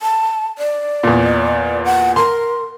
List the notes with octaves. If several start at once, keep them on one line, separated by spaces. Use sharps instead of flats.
A5
D5
E2 A#2
F#5
A#4 C6